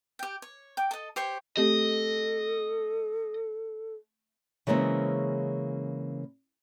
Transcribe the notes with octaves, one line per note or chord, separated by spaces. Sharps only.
G4 G5
C#5
G5 D6
A4 D#5
G4 C5 C#5 C#6
A3 C4 G4 A4 D#5
C#3 E3 G#3 A#3 C4 C#4